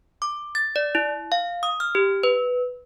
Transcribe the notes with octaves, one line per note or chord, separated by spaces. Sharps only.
D6
A6
D5
E4
F5
D#6
F6
G4
B4